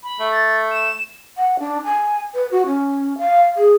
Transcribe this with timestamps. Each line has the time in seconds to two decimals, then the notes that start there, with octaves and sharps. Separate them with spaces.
0.03 B5
0.20 A3
0.32 A6
0.72 E7
1.37 F#5
1.59 D4
1.85 G#5
2.35 B4
2.51 F#4
2.66 C#4
3.19 F5
3.57 G#4